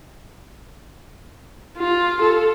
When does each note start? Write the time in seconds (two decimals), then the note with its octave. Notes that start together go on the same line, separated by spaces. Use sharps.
1.78 F4
2.21 A4